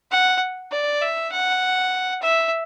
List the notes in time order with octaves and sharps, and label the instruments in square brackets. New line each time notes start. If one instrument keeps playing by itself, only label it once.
[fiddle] F#5
D5
E5
F#5
E5